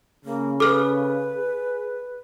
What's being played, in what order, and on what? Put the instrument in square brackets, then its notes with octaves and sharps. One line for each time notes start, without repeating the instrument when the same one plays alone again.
[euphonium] C#3 [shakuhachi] A#3
[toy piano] A4 [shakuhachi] B4 [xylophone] D6 F6
[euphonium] G#4